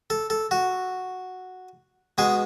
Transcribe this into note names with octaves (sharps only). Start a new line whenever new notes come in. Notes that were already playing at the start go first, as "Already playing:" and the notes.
A4
A4
F#4
B2 G#3 B3 G#4